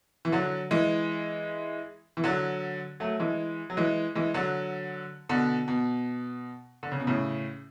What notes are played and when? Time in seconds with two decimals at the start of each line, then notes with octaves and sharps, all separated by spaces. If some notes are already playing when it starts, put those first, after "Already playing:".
0.25 E3
0.32 D3 F#3
0.71 E3 G#3
2.17 E3
2.24 D3 F#3
3.00 F#3 A3
3.20 E3 G#3
3.70 F#3
3.77 E3 G#3
4.15 E3 G#3
4.34 D3 F#3
5.29 B2 D3
5.68 B2
6.83 D3
6.92 C#3
7.00 B2
7.07 A2 C#3